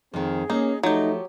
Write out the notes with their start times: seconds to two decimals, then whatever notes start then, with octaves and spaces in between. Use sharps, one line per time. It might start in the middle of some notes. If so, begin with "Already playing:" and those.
0.14 F2 D#3 C4 G#4
0.50 A#3 C#4 D#4
0.83 F3 F#3 A3 D#4 G4